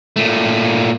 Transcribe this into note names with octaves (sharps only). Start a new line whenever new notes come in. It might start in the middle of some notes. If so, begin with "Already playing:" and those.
A#2 A3